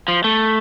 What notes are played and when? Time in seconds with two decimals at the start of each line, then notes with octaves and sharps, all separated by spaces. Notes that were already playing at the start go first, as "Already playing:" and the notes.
0.08 F3
0.24 A3